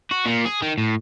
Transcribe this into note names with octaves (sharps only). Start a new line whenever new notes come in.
F#4
A#2
G#4
D#3
A2